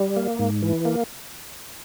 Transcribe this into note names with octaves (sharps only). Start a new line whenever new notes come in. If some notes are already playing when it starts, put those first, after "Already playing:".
Already playing: G3
A#3
G#2
E3
A#3